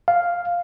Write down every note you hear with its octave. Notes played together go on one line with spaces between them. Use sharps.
F5